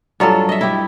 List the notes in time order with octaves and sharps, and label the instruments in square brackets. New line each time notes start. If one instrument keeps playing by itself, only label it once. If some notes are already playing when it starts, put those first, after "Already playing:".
[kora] G2 F#3 F4 A4
D#5 E5
E4 G4